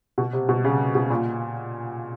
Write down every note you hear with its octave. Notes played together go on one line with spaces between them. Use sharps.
B2
C3
B2
C#3
B2
A#2